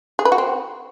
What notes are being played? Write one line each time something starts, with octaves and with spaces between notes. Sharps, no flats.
G#4
B4
F#4
C4